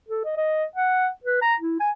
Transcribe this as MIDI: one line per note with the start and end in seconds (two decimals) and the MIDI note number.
0.08 0.25 69
0.25 0.35 75
0.37 0.64 75
0.75 1.08 78
1.24 1.41 71
1.42 1.54 82
1.60 1.79 64
1.80 1.90 80